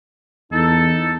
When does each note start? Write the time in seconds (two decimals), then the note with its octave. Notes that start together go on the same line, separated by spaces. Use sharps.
0.52 E2 D#4 A4